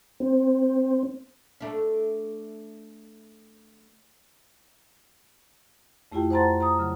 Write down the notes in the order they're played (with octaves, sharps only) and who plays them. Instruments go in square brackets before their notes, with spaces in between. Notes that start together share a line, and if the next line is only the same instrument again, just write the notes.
[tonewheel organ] C4
[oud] A3 D4
[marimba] F2 A3 E4 F4 G4 G5
C5 F#5 A5 A#5 C6 A6
A#5 D#6
C#3 F#3